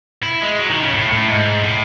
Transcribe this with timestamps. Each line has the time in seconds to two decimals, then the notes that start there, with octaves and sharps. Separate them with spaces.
0.23 E4
0.42 G#3
0.59 F#3
0.70 D#3
0.83 C#3
0.94 A2
1.11 A2
1.29 G#2
1.64 A2